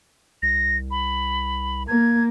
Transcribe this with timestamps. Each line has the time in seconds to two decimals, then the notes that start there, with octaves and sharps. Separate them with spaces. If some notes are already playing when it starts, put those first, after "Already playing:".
0.42 C2 A#6
0.91 B5
1.88 A#3 G#6